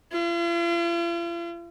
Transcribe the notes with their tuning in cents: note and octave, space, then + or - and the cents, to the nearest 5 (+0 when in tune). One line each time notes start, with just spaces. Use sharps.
F4 -45